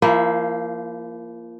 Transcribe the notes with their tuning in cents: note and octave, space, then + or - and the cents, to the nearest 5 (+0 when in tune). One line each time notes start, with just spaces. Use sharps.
F3 -25 A#3 +5 E4 +5